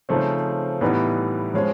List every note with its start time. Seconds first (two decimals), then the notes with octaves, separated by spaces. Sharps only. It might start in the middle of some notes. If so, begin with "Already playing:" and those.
0.09 C#3 F3 A3 C4 D#4
0.81 A2 E3 G3 B3 D#4
1.54 F3 G#3 C#4